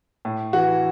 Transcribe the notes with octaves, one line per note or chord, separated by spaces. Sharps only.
A2
E3 F#4